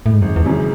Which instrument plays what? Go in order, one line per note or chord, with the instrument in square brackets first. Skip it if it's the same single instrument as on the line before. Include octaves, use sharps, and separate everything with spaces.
[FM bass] A2
G#2
[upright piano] G#1 [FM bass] F#2
[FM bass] E2
[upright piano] F#2 C#3 E3